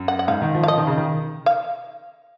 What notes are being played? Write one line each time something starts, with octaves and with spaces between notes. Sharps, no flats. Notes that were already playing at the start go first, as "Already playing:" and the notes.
Already playing: F#2
F#5
F#5
G#2 F5
D#3
F3
F5
F3 D#5
D#3
C#3
D#3
F5